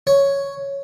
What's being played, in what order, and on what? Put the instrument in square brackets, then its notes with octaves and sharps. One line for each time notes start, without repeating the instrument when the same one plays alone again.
[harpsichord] C#5